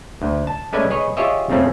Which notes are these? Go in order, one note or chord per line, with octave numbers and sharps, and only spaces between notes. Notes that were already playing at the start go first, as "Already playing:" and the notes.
D2
A5
G#3 A3 C#4 B4 D5 G#5
G#4 B4 C#5 D#5
F4 G4 G#4 C#5 D#5 E5
F2 C#3 F3 A3 C4 C#4